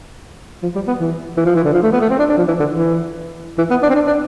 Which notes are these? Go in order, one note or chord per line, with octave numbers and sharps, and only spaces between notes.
F3
G3
B3
E3
E3
F3
E3
D3
F3
A3
B3
A3
C4
D4
D4
F3
E3
D3
E3
E3
B3
D4
C4
D4
D4